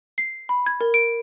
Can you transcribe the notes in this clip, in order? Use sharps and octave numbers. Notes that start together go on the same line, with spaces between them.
C7
B5
G#6
A#4
D7